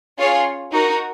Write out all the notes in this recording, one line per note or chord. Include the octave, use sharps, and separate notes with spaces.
C#4 F4 G#4 C#5
D#4 F#4 A#4